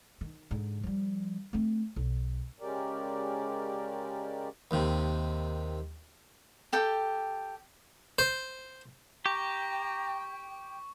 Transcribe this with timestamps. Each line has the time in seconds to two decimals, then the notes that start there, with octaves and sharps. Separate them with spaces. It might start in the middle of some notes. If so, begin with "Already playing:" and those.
0.21 D#3
0.51 G#2 D3
0.83 F3 G3
1.53 A3 C4
1.96 B1
2.60 C#3 G#3 C#4 G4 A#4 D5
4.71 D#2 C3
6.72 G4 A4 G5
8.19 C5
9.26 G4 G5 A#5 C#6